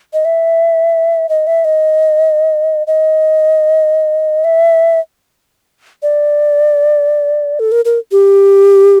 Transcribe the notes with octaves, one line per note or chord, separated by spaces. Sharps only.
D#5
E5
D#5
E5
D#5
D#5
E5
D5
A4
A#4
A#4
G4